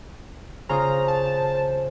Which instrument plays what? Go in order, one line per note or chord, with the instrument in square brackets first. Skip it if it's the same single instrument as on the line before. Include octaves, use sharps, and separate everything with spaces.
[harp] C#3 F4 D#6 [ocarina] C5 [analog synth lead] A#5
[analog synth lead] A5